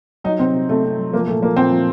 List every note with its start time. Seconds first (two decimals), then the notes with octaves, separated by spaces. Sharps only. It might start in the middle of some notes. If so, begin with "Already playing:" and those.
0.24 F#3 D#4
0.39 C3 C4
0.54 C3
0.69 C3 A3
0.83 C3
0.98 F#3
1.13 F3 A#3
1.27 A#2 A3
1.42 F3 A#3
1.56 A#2 C4
1.72 F3